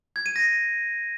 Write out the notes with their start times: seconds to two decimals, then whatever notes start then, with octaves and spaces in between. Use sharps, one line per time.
0.16 G#6
0.26 D#7
0.36 A#6